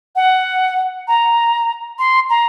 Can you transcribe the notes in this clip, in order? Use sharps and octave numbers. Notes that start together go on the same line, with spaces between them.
F#5
A#5
C6
A#5